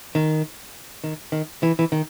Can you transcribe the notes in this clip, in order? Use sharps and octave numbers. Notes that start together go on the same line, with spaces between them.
D#3
D#3
D#3
E3
E3
D#3